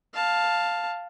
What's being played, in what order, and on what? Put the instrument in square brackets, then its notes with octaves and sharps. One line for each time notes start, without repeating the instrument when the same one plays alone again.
[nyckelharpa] F5 A5